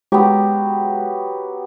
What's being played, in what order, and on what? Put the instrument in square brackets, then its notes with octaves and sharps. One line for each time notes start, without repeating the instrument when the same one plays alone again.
[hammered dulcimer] F#3 B3 [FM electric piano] G#3 [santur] G4